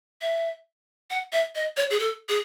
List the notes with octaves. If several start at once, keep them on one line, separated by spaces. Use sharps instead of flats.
E5
F#5
E5
D#5
C#5
G#4
A4
G#4